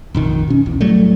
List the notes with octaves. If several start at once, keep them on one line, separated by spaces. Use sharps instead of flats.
F1 A#1 D#3
B2 C#4
B1 E2
A2 F#3 G3 A3